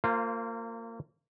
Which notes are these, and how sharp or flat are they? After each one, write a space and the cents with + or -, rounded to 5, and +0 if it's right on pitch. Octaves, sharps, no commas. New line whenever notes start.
A#3 -30 F4 +0 C5 -10